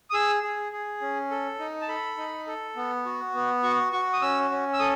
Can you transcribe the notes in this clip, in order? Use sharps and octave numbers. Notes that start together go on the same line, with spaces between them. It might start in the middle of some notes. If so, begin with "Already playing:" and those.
D#6
G#4 E6
G#4
G#4
C#4
A4
D#4
A5
A4 B5
D#4
A4
B3
F#4
B3
F#4 C#6
F#4 C#6
D#6
C#4 E6
C#4
E6
A4 D#6